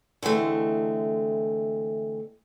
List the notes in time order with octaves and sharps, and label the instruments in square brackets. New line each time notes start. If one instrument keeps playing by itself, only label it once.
[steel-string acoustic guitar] D3 E3 G#3 A3 C4